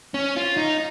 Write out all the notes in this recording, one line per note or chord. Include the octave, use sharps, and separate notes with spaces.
C#4
F4
D#4